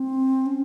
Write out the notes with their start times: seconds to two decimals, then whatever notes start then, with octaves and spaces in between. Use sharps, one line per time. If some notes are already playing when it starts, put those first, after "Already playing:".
Already playing: C4
0.46 C#4